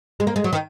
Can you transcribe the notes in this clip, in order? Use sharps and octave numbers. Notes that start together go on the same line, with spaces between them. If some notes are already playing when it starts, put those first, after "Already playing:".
G#3
A#3
G#3
F#3
D#3